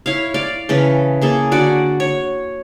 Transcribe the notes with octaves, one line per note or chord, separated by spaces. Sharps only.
E4 C#5 F5
D5 F5
C#3 E3 A4
A#3 G#4 A4
D3 F#4 D5 F#5
C#5